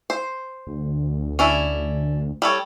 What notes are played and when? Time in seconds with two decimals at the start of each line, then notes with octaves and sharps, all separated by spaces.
0.10 C5
0.67 D2
1.39 C#4 D4 E4
2.42 G3 A4 C#5